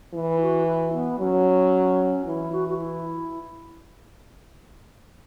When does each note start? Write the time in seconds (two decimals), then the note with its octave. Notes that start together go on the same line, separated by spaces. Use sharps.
0.14 E3 E4
0.41 F#4
0.67 E4
0.93 B3
1.19 F#3 C#4
2.26 E3 E4
2.52 F#4
2.69 F#4
2.78 E4